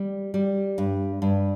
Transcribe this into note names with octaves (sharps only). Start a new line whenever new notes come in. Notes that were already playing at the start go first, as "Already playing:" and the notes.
Already playing: G3
G3
G2
G2